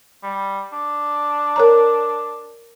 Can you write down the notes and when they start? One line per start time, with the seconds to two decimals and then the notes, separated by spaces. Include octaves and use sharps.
0.23 G3
0.73 D4
1.56 A#4 C#5 A#5